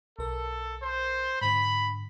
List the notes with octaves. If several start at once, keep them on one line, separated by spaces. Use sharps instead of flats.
B1 A4 A#4
C5
G#2 D3 B5